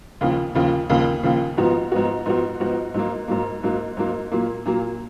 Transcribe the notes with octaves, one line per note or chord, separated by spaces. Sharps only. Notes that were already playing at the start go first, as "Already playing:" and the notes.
D#2 C#3 F3
D#2 C#3 F3
D#2 C#3 F3
D#2 C#3 F3
G#2 F3 B3 F#4
G#2 F3 B3 F#4
G#2 F3 B3 F#4
G#2 F3 B3 F#4
G#2 F#3 A#3
G#2 F#3 A#3
G#2 F#3 A#3
G#2 F#3 A#3
A#2 F#3 A#3
A#2 F#3 A#3